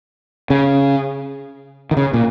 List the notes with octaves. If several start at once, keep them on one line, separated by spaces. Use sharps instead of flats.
C#3
D#3
C#3
A#2